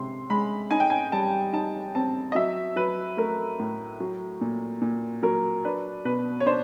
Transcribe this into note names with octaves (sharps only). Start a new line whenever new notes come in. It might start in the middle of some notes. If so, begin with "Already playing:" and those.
Already playing: C3 G#3 C6
G#3 B5
D#4 G#5
G5
G#5
G3 A5
D#4 A5
C4 A5
D#5
F#3 E5
F#3 B4
A3 A#4
A2
F#3
A#2
A#2
F#3 A#4
D4 B4
B2 B4
C#5
D4 C5